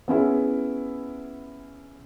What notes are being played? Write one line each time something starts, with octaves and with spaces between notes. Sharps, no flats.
B3 C#4 E4 G#4